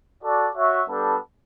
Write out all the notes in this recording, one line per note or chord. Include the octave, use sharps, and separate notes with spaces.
F#4 A4 D5
F#4 C#5 E5
G3 B3 D4 A4